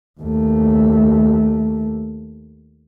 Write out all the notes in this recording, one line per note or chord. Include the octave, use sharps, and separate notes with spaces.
D#2 A3